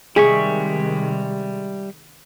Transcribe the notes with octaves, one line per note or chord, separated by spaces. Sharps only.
C3 D#3 G3 G#3 G#4 E5 C#6